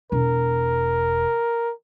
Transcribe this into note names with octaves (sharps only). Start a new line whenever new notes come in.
E1 A#4